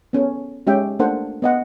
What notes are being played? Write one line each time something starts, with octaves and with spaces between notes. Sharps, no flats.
B3 C#4 A4
G#3 C#4 G4 E5 G5
A3 A#3 D4 A4 C5 F#5
B3 D#5 F#5